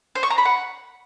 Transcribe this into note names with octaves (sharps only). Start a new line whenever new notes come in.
C5
C#6
A#5
B5
F#5